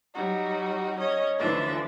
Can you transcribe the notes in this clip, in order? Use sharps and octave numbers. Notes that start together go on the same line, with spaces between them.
F#3 G3 D#4 F#4
C#4 C#5 D#5
D2 E3 F3 D4 E5 A6